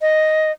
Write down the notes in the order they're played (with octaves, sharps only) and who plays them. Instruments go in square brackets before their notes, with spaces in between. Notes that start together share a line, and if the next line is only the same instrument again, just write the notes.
[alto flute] D#5